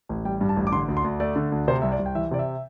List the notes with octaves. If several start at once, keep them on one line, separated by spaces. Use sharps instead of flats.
A1
G3 G5
G2
A5
A1
D6
D3 C6
D2
C6
D2
A3 D5
D3
D2
C3 C5
C2 E5
D5
C2
G5
E3 E5
C3 D5
E5